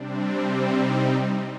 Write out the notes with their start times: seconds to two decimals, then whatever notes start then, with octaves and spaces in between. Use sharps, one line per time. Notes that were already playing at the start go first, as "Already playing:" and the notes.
Already playing: C3 G3 C4 D4
0.63 D#4